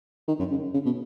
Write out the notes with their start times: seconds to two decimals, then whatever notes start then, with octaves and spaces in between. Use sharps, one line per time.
0.28 D#3
0.39 F#2
0.51 C#3
0.74 C#3
0.86 B2